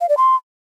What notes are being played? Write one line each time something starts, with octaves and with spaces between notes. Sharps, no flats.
F5
D5
C6